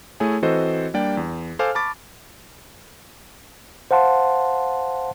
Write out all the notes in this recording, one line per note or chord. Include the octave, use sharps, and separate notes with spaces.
A3 E4 G#4 C#5 G#5
E3 C4 F#4 A4 C5 D#5
G3 A#3 D4 G4 D5 G5
E2
A4 C5 F5 G#5 D6 F6
A5 B5 C#6 D6 A6
C5 F5 F#5 A5 C6